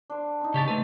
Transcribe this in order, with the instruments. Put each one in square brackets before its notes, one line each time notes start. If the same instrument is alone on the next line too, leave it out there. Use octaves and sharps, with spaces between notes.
[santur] D4 C5
C4 D#4
[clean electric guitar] C#3 G4 A5 [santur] C#5 D#5
[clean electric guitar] A3 B4 [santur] C4